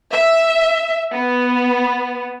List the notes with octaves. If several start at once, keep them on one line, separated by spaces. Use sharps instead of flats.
E5
B3